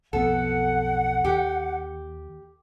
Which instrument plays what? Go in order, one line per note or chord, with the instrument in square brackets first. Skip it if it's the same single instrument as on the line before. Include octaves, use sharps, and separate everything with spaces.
[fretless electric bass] B1 F2 B3 [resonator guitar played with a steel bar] A4 [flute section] F#5
[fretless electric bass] D#2 [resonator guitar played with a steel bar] G4